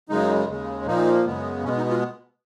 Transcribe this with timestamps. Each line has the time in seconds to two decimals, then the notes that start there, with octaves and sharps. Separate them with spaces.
0.09 F#2 C#3 G#3 D#4
0.48 D#2 C#3 G#3
0.86 A#2 F3 A#3 D#4
1.26 F#2 C#3 G#3 B3
1.64 B2 G#3 B3 C#4
1.77 D#4
1.90 F4